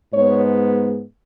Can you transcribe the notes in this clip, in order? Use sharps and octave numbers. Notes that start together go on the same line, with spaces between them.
G#2 G#3 B3 C#5